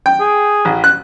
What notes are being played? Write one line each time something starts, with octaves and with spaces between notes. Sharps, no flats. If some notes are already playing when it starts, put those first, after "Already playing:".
G5
G#4
A1
F#6